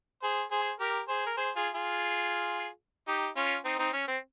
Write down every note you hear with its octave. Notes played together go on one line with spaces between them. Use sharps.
G#4 C5
G#4 C5
G4 A#4
G#4 C5
A#4
G#4 C5
F4 G#4
F4 G#4
D#4 G4
C#4 F4
C4 D#4
C4 D#4
C#4
C4